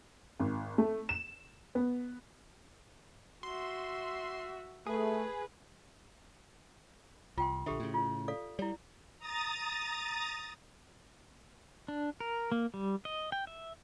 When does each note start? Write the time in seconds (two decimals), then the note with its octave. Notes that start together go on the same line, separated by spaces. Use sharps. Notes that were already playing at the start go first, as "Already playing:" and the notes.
0.40 G#1
0.78 A3
1.09 E7
1.75 B3
3.43 F#4 E5 C6
4.86 A3 G#4 B4
7.38 C2 F4 G5 C6
7.66 A#1 D3 G4 A4 E5
7.80 A2 C#3
7.94 F4
8.28 A4 D5 F5
8.59 G3 E4 D5
9.18 A#5 D#6 A6
11.88 D4
12.20 A#4
12.52 A#3
12.74 G3
13.05 D#5
13.32 G5
13.47 E5